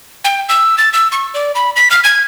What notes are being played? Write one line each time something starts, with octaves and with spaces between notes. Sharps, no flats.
G5
E6
A6
E6
C#6
D5
B5
B6
F6
G#6